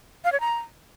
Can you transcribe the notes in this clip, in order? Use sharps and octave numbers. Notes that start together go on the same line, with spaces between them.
F5
C#5
A#5